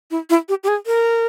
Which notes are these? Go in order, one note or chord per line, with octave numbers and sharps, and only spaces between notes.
E4
E4
G4
G4
G#4
A#4